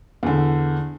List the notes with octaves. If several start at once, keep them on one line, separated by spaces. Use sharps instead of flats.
E2 D3